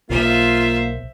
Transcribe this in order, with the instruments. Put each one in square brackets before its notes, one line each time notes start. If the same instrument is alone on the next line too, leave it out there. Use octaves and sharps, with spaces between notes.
[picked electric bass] B1 [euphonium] A#3 [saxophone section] F4 [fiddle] C5 E5